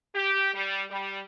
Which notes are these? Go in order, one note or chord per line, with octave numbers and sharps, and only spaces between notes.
G4
G3
G3